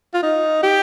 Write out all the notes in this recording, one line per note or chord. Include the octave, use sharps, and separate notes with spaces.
F4
D#4
G4